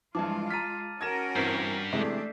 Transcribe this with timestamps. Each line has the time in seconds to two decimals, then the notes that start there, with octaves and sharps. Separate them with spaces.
0.15 G2 E3 F3 G#3 F4 A5 D6
0.50 A#5 F6 A6 B6 D#7
1.01 C#4 F#4 A#4 G#6 A#6 E7
1.36 G2 E3 C4 G6 B6 C7
1.93 C3 E3 G#3 A3 D4